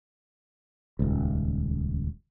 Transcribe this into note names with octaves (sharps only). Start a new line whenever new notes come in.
D#1 C#2